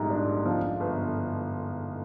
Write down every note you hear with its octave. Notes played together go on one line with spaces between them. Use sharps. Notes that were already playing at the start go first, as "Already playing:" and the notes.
Already playing: A#1 G#2 G3 A#5
D4
F3
G1